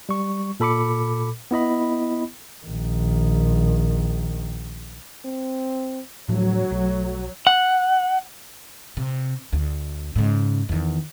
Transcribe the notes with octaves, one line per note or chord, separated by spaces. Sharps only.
G3 C#6
A#2 A4 B5 D6 C#7
B3 E4 D#5 B5
A#1 D#3
C4
D2 A2 F3 F#3
B1 A3
F#5
C3
D2
G#2 C#3
E2 D#3